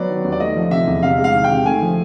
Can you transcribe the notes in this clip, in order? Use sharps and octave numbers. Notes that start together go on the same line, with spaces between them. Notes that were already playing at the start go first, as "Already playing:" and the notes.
Already playing: F#3 B3 D5
D#3
D#2
D5
A3 D#5
F3
C3 E5
E2
C3 F5
G#3
F5
D#3
G5
C3
A3 G#5
F3